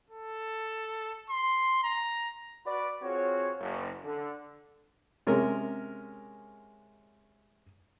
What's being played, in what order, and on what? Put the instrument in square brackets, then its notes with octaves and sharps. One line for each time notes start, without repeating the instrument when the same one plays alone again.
[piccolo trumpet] A4
C6
A#5
[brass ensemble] F#4 B4 D5
C4 F4 F#4 G#4 C#5
F#1
D3
[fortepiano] C3 G#3 C#4 A#4